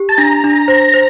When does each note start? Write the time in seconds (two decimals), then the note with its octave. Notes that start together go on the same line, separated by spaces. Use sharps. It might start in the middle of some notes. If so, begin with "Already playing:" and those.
Already playing: G4
0.09 A5
0.18 D4 A#5
0.44 D4
0.68 C5
0.94 C5